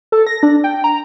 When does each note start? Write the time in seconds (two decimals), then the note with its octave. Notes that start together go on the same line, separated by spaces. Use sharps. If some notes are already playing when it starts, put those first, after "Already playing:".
0.12 A4
0.27 A#6
0.43 D4
0.64 G5
0.84 A#5